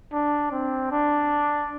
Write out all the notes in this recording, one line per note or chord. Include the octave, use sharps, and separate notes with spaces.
D4
C4
D4